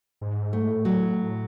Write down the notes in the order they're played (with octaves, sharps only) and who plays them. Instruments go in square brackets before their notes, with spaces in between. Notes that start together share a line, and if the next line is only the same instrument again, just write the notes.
[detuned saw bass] G#2
[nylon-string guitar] A3
[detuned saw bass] A2
[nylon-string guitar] F#3